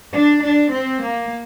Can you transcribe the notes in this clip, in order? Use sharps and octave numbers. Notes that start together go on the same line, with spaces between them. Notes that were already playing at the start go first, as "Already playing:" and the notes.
D4
D4
C4
A#3